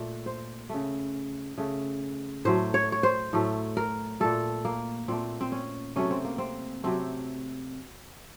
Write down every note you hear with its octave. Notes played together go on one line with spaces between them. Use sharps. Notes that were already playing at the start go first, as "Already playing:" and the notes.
Already playing: A#2 A3
C5
C#3 A3
C#3 A3
A2 F#3 A3 C5
C#5
C#5
C5
A2 F#3 A3
A#4
A#2 A3 A4
A#3
A#2 A3 C4
C4
C#4
C3 F#3 A3 C#4
C4
A#3
C4
C3 F#3 A3 C4